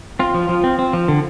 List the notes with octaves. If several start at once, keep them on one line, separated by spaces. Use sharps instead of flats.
C4 F4
F3
F3
C4
C4
F3
D3